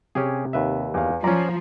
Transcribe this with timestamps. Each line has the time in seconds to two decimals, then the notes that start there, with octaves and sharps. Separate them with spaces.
0.15 C3 C#4 G4 G#4
0.53 D#2 B4 E5
0.94 E2 F5
1.24 F3 C#4 D5 A#5